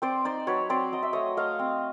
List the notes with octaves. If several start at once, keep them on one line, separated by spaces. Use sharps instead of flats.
C4 C5 D5
D#4 C5 D5
F#3 B4 C#5
C4 C5 D5
F#3 D#5
E5
A3 C#5 D#5
A3 D#5 F5
C4